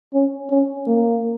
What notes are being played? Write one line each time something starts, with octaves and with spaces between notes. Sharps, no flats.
C#4
C#4
A#3